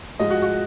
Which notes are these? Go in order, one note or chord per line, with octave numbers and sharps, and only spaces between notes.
G#2 F3 G#3 D#5
F#4
F#4